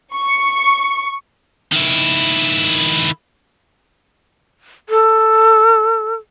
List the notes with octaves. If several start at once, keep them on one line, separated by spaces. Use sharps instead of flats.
C#6
D#3 E4
A4